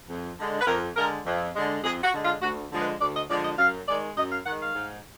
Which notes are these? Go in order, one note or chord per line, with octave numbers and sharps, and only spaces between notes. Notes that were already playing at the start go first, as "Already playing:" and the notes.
F2
D3 G#3
B4
F2 A#4
D3 G#3 A#4
F2
D3 G#3
F2 G#4
F#4
D3 G#3
F4
D2 F#4
D3 F3 G#3
B4
D2 D5
D#5
D3 F3 G#3 D5
D#5
F#2 F5
D#3 G#3 D5
F#2 D#5
F5
D#3 G#3 F#5
F5
G#2